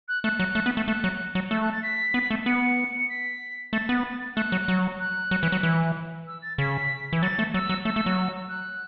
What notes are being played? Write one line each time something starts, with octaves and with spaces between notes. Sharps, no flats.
F#6
A3 F#6
F#3
A3
B3
A3
A3 F#6
F#3
F#3
A3 E6
F#6
A6
B6
B3
A3
B3 C#7
C#7
B6
A3 A6
B3
A3 F#6
F#3
F#3
F#6
F#3
E3
F#3
E3
E6
A6
C#3 B6
E3
F#3 A6
A3
F#3 E6
F#3
A3 E6
A3
F#3
F#6